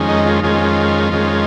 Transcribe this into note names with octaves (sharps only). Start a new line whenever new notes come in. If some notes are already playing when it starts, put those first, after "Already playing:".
Already playing: F2 D#3 G#3 C#4
D#4
F4
F2 D#3 G#3 C#4 F4
F2 D#3 G#3 C#4